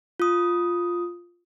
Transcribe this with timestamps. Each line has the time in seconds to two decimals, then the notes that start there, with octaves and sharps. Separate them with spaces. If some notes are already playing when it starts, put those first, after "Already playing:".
0.20 F4 D#6